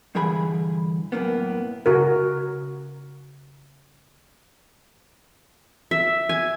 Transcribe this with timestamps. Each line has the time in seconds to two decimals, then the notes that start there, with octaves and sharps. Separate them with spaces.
0.15 G2 D3 E3 G#4 G#5 B5
1.12 F#2 A2 A#3 B3
1.86 C#3 F#4 A#4
5.91 E5
6.29 G#5